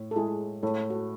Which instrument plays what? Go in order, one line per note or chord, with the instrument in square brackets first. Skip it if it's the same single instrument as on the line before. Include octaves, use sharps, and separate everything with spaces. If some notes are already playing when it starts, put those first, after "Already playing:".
Already playing: [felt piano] A2
[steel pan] A4
[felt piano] G#3 [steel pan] E4 G#4
[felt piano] A2 [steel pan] A4
[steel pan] F#4 A4